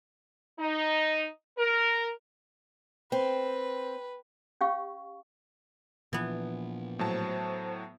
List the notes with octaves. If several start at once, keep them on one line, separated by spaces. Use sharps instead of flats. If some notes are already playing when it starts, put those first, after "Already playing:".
D#4
A#4
C4 B4
C#4 G4 F5 C#6
A#2 E3 F3 B3
A2 F#3 C5 A5